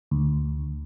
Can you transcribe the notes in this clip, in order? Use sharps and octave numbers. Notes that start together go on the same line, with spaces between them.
D2